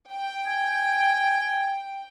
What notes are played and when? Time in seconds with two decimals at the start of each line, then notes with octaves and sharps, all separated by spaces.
0.12 G5
0.47 G#5